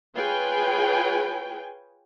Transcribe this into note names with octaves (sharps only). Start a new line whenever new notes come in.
F4 G#4 B4 C#5 G5 G#5